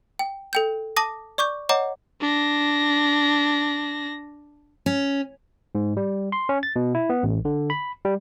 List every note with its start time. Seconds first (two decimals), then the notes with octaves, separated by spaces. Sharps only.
0.19 G5
0.53 A4 G5 G6
0.97 A5 D6 D#6 A#6
1.38 D5 C#6 D6 G6
1.69 C#5 D#5 F#5 A#5 D6
2.21 D4 A#6
4.86 C#4
5.75 G#2
5.97 G3
6.32 C6
6.49 C#4
6.63 A6
6.76 B2
6.95 E4
7.10 B3
7.23 A1
7.45 D3
7.70 B5
8.05 G3